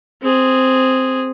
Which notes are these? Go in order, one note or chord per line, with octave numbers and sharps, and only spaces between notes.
C4 G#4